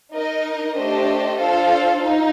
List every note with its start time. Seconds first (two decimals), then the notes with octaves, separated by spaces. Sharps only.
0.12 D#4 A#4 D#5
0.75 A3 D4 G4 C5 D#5
1.39 D4 F4 A4 C5 F5
2.02 D#4